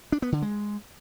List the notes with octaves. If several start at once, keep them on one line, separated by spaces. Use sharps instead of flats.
D4
B3
D3
G#3